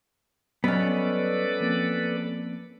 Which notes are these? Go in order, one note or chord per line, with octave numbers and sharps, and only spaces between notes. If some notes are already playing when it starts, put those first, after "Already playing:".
F#3 G3 B3 C#4 A4 B4 D5 D#5
F3 A#3 C4